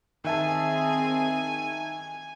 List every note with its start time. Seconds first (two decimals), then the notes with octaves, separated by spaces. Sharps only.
0.24 D#3 C4 G#4 E5 G#5 A5